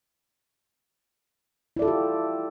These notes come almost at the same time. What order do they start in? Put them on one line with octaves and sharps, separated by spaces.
E4 D5 A4 F4 G4